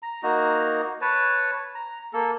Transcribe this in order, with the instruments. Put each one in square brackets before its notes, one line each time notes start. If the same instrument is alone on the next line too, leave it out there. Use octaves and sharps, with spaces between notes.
[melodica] A#5
A#3 D#4 F#4 A#5
B4 C#5 A5
A#5
A#3 A4